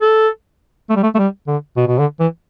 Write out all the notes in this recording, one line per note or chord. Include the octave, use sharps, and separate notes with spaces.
A4
A3
G3
A3
A3
G3
D3
B2
B2
D3
E3